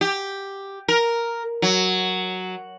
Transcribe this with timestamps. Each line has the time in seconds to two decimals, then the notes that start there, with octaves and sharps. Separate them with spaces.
0.01 G4
0.88 A#4
1.62 F#3